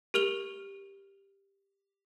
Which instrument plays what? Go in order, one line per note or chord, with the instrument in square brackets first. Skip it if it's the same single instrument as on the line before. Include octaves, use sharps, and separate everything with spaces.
[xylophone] G4 A#4 F6 F7 G7